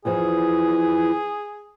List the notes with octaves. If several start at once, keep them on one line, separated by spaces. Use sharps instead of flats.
E2 E3 F3 G#4